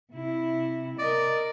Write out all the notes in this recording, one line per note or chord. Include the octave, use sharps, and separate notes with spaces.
C3 E4
A#4 D5 D#5